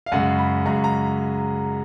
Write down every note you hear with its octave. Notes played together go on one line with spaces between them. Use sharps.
F5
F#2 C#3 G#3 F#5
B5
F#2 C#3 G#3 A#5
A#5